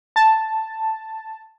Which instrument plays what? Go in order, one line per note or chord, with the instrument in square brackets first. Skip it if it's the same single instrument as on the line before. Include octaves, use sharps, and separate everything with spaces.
[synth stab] A5